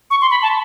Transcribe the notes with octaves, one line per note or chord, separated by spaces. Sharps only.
C#6
C6
B5
A5